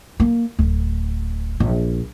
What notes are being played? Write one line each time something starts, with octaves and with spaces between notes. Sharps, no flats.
A#3
D1
A#1